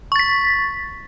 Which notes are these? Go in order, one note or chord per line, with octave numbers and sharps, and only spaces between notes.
C#6 A6 B6